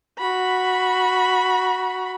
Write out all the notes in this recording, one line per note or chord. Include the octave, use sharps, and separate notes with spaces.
F#4 B5